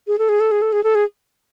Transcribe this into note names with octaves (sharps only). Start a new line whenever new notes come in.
G#4
A4
G#4
A4
G#4
A4
G#4
A4
G#4